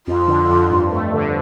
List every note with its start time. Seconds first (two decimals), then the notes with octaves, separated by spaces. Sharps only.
0.07 F2 F4
0.28 D3
0.50 F2
0.71 G2
0.92 A3
1.14 D3